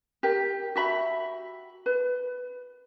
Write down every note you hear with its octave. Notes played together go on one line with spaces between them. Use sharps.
G4 A#4
F#4 E5 B5
B4